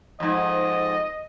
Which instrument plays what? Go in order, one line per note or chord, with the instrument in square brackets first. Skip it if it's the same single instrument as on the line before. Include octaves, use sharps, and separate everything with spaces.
[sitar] F2 G#2 [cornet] D#5